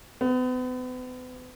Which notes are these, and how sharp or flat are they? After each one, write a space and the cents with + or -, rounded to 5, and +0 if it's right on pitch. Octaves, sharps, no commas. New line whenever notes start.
B3 +40